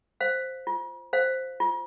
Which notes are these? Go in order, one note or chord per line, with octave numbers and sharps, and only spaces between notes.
C5 F5
F4
C5 F5
F4